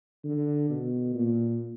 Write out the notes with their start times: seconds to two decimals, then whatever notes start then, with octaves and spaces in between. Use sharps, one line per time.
0.24 D3
0.70 B2
1.14 A#2